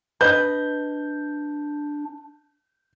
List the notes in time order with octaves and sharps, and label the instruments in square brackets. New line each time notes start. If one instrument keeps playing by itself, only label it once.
[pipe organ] D4 [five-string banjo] B4 D#5 [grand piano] G6